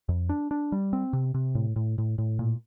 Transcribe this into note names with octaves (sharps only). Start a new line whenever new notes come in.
F2
D4
D4
G3
C4
C3
C3
A2
A2
A2
A2
A#2